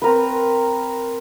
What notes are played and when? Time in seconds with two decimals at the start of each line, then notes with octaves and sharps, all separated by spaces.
0.02 C4 A#4 B4